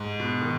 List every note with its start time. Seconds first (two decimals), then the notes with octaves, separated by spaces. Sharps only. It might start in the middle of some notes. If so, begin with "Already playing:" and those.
Already playing: G#2
0.20 B2
0.42 D#3